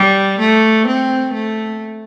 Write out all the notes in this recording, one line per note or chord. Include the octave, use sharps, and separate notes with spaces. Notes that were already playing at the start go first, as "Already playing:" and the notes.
Already playing: G3
A3
C4
A3